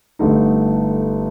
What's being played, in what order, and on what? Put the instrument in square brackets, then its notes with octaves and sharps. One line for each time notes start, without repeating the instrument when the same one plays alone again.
[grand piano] G1 G2 D3 A3 D#4